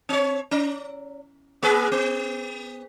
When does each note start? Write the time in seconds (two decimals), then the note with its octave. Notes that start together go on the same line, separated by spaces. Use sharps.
0.09 C4 C#5
0.51 C#4
1.63 A#3 G#4 B4
1.92 B3